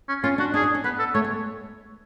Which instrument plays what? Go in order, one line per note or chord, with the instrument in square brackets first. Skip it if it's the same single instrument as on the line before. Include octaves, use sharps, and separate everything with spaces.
[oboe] C#4
[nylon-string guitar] C#4 [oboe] F4
[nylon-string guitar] D4 [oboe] F#4
[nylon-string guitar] D4 [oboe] G#4
[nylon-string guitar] D4
C#4
[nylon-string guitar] B3 [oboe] B4
[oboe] A4
[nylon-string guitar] A3 [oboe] C#5
[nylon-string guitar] G#3